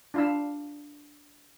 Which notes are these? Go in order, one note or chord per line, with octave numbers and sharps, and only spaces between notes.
D4 F4 F5 B5 E6